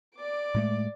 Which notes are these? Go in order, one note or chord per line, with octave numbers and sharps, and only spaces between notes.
D5 D6
A2 G#3 A3